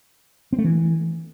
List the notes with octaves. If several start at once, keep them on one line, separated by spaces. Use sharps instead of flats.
C4
A3
E3